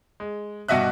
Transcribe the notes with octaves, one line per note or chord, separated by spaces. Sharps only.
G#3
G2 B2 F#4 D#5 E5 F#6